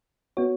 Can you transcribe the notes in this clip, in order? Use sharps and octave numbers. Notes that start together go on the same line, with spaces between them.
B3 F#4 C#5